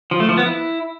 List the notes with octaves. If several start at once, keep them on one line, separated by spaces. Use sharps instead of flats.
F3
A3
F3
B3
E4